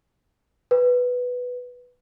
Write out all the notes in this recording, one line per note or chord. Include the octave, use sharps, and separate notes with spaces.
B4